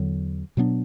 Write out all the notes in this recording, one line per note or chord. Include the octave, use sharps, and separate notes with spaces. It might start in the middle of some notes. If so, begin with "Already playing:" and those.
Already playing: E2 D3 F#3
B2 F#3 B3 D4